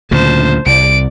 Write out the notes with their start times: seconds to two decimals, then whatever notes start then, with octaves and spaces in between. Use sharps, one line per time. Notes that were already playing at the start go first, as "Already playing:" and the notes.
0.11 D2 A#2 C#3 C5 A5
0.66 C2 D5 D7